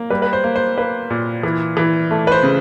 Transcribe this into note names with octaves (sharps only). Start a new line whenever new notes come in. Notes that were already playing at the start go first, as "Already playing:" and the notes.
Already playing: A#3
G3 B4
B4
C5
A#3
C5
A#3 B4
A#2
E3
E3
A3
B4
C5
C#3